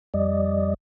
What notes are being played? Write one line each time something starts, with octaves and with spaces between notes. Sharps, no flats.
F2 G3 D5 D#5